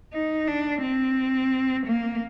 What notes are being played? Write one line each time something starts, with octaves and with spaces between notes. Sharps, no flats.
D#4
D4
C4
A#3